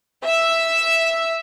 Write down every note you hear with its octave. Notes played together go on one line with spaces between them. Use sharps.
E5